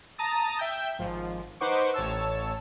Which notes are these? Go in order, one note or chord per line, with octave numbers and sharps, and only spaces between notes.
A5 A#5 D#6 A6
E5 G5 G6
G#1 F3
D#4 B4 C5 F#5 C#6 D6
A1 C#5 A5 E6